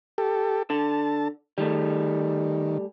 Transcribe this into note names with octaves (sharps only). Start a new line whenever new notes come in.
G4 A4
D3 A5
D#3 G3 A3